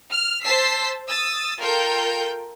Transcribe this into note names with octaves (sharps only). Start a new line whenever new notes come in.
F6
C5 A5 E6 B6 C7
D#6 E6 A6
F4 A4 A#4 G5 G6